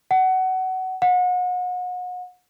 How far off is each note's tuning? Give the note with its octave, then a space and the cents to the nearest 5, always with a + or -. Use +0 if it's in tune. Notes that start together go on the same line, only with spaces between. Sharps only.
F#5 +20
F#5 -35